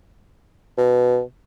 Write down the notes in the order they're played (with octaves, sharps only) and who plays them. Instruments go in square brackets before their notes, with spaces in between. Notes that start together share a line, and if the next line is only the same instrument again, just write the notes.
[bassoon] B2